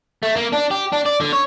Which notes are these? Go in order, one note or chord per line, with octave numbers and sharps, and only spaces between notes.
A3
A#3
D4
G4
D4
D5
D3
C#5